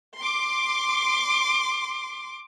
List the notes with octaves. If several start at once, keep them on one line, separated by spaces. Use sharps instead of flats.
C6 D6